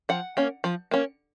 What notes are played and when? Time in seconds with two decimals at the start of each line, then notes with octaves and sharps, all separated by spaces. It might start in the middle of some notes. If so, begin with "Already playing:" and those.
0.09 F3 F#5
0.37 A#3 C#4
0.64 F3
0.91 A#3 C#4